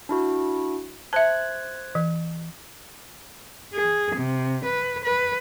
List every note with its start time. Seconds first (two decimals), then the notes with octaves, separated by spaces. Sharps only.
0.09 D4 E4 F#4
1.13 C5 E5 A5 F#6 G#6
1.95 E3
3.74 G#4
4.15 C3
4.65 B4
5.04 B4